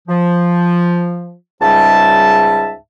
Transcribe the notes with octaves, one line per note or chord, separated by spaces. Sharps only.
F3
C#2 G#2 G3 E5 A5